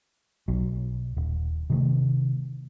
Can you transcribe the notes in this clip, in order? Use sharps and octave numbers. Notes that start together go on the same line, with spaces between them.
B1 F#3
D#1
C3 D#3 A3